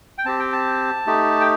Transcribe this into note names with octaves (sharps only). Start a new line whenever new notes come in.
G5
C4 G4 A5
G5
A5
A3 D#4 G4
G5